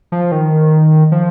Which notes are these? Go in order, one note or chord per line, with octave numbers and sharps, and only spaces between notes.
F3
D#3
F3